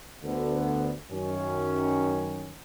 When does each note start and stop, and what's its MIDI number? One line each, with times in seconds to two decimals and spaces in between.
0.23 0.92 38
0.23 0.92 50
0.23 0.92 59
1.11 2.54 42
1.11 2.54 51
1.11 2.54 61